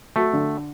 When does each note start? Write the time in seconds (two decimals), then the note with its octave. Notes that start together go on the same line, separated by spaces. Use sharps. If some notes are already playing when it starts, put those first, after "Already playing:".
0.16 A3 F#4
0.33 D3